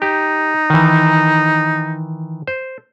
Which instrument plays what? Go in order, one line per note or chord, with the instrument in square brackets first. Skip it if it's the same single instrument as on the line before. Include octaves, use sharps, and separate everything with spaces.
[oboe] D#4 [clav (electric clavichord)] G4
[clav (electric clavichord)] D#3 E3
C5